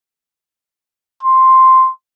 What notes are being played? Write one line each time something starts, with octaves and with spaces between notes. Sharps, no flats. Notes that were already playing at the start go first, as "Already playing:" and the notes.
C6